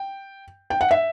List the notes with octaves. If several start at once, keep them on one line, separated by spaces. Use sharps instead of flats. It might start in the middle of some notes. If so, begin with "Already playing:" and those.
Already playing: G5
G5
F#5
E5